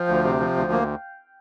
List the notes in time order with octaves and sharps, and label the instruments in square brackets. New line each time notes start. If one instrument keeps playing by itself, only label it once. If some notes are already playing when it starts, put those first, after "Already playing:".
Already playing: [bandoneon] F3 [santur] F5 G5
[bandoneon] D2
C3
F3
D2
A#3